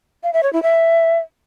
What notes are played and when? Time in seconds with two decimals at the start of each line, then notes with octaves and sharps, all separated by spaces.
0.23 F5
0.33 E5
0.43 C#5
0.53 E4
0.63 E5